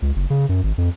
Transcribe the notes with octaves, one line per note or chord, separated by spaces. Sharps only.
C#2
F#1
C#3
F#2
G#1
F2